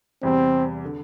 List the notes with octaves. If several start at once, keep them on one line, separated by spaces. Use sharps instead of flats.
E2 C3 G3 C4
D3